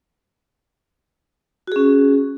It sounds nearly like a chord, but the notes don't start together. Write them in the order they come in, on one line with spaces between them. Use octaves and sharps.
F#4 G#4 C#4